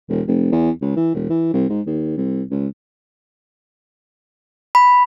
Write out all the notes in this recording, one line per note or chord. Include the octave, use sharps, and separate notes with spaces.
E1
F1
E2
C#2
E3
E1
E3
C2
G#2
D#2
C2
C#2
B5